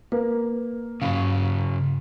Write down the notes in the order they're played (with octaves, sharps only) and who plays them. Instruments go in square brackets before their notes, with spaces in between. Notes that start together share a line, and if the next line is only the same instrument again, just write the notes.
[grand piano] A#3 A#4 [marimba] B4
[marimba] G2 F5 [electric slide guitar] C#3 F#3